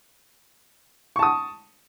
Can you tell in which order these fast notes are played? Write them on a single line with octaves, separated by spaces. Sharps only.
C#6 A5 D#6